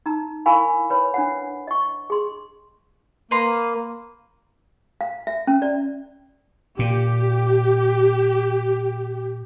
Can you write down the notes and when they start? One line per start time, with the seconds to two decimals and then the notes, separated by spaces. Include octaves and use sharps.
0.06 D#4 A#5
0.46 E4 A#4 F5 G#5 B5 C#6
0.90 B4 C#5 B5
1.14 D4 C5 F#5
1.67 D#5 C#6
2.10 G#4 C6
3.31 A#3 B4 A#5 C6
5.01 F5
5.27 E5
5.47 C#4
5.62 D5
6.79 A#2 G4